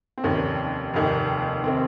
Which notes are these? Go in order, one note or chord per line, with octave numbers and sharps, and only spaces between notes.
C4
F1 D#2 D#3 C#4
F1 D#2 D#3
D#3 C4